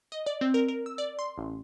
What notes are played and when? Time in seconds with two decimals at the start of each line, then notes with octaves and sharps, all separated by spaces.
0.12 D#5
0.26 D5
0.41 C4
0.54 A#4
0.68 A#4
0.86 E6
0.98 D5
1.19 C6
1.38 A1